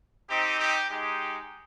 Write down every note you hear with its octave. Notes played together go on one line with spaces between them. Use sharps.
C4 D#4 G4
G4
G#3 D#4 G4